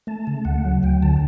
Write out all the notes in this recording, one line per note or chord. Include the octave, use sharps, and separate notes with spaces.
A3 A5
C#3
D2 F#5
F#3
D2 G5
D3 A5